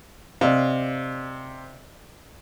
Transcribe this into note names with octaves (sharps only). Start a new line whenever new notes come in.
C3 D5 D#5 F5